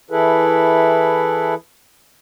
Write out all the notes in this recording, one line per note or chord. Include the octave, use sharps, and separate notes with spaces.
E3 E4 G#4 A4 B4